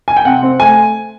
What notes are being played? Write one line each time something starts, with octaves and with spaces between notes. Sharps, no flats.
G#5
G5
C3 F#5
C4
A3 G#5